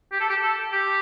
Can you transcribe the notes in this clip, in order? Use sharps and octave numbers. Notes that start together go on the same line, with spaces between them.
G4
A4
G4
A4
G4